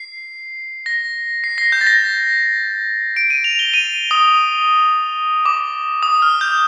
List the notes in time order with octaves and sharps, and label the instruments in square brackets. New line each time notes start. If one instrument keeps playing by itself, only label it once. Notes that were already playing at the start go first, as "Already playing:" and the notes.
Already playing: [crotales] C7
A#6
C7
A#6
G6
A6
A#6
D7
D#7
F7
G7
D#7
D#6
D6
D#6
F6
G6